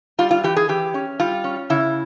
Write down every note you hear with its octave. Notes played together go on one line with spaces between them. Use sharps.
G3 F4
F4
E3 G4
G#4
E3 G4
C#4
G3 F4
C#4
C#3 E4